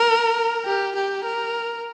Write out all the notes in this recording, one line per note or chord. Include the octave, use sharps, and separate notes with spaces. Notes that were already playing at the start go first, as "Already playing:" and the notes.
Already playing: A#4
G4
G4
A#4